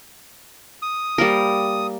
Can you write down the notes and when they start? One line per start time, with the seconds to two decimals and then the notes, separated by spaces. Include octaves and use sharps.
0.82 D#6
1.18 G3 A#3 A#4